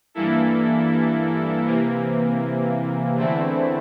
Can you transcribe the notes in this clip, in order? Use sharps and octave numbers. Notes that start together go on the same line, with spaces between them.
G2 E3 A#3 E4 A4
C3 E3 A#3
E2 D3 A3 C4 E4